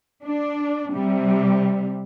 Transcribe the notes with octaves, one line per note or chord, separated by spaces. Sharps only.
D4
C3 G3